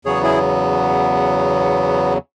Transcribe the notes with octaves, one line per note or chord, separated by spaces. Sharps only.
E2 C#3 F#3 B3 G#4 C#5
E4 G#4